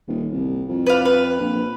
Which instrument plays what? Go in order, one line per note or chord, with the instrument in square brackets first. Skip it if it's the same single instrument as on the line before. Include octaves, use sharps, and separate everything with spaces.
[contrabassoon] D#1
C2
F2
[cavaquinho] B4 D5 F5
B4
[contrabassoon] A#1